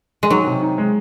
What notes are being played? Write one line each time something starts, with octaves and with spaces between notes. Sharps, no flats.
G#3
D#3 F#3
C3
D#4
G#3